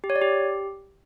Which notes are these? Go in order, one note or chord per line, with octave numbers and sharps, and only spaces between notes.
G4
C#5
D5
G4